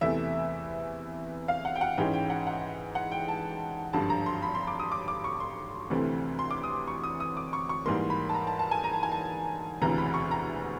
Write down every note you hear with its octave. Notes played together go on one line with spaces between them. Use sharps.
E2 C3 E3 A3 E5
F5
F#5
G5
F#5
G#2 E3 G#3 C#4 G5
G5
F#5
F#5
F#5
G5
A5
G#1 G2 D3 F3 A5
A#5
C6
B5
C6
D6
D#6
D6
D6
C#6
C6
D2 C3 E3 A3 C4
C6
D6
D#6
C#6
D#6
D#6
D6
C#6
C#6
G#2 E3 G3 A#3 C6
B5
A5
A#5
A5
A5
G#5
A#5
A5
G#5
A5
E1 D2 C3 E3 A#5
B5
C#6
A#5